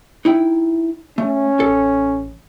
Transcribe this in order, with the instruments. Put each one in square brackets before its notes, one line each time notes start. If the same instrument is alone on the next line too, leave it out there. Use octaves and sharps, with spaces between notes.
[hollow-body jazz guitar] D#4 E4 G5
[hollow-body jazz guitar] A3 [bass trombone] C#4
[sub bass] A1 [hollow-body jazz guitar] A4